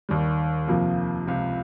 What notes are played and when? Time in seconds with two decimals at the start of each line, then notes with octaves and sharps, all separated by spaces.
0.09 D#2 D#3 G3
0.67 F2 C3 F3 A#3
1.27 C#2 C3 F3